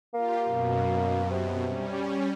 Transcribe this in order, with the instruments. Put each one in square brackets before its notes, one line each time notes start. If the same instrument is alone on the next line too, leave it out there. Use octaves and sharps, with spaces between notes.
[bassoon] A#3 [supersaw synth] F4 G4
[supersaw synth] F#2 B2
[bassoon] C3
[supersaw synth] G3 C#4